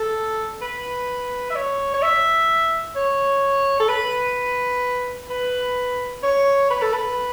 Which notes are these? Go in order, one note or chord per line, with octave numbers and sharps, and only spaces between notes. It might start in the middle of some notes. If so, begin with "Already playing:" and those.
Already playing: A4
B4
E5
C#5
C#5
E5
C#5
A4
B4
B4
C#5
B4
A4
B4